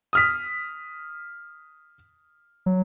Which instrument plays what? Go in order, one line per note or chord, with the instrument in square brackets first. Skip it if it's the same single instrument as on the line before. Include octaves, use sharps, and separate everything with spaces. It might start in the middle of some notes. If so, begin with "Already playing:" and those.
[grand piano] D#6 F6 B6
[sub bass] F#3